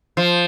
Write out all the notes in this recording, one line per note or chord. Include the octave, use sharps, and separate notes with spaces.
F3